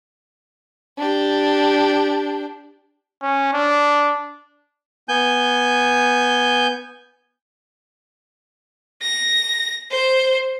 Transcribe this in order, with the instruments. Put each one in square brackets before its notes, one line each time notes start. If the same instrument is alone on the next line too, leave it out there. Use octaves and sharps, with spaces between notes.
[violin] D4 G4
[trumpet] C#4
D4
[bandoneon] B3 G#5 G6
[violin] A#6
C5